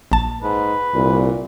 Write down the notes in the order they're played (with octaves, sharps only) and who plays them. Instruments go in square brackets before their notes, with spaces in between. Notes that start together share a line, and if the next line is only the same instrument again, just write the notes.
[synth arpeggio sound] A#1 A5
[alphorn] G#2 [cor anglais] B4
[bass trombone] C2 [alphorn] A#2